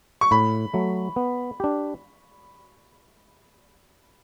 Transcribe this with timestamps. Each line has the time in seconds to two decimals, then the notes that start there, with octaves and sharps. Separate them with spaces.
0.21 C#6
0.31 A2 B5
0.74 F#3 A3
1.16 B3
1.60 D4 G4